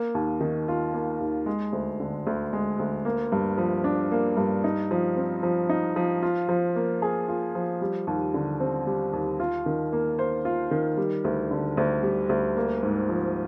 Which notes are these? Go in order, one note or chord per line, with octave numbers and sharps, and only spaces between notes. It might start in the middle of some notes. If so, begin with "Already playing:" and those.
Already playing: A#3
D#2
D#3
F4
A#3
D#2
G#3
D2
D3
D2
G#3
D2
A#3
G2
F3
D4
A#3
G2
D#4
F3
C4
F3
D#4
F3
F4
F3
A#3
G#4
F4
F3
G3
D#2
D3
C4
G3
D#2
F4
D#3
A#3
C5
F4
D#3
G3
D2
D3
D2
G3
D2
A#3
G#2
F3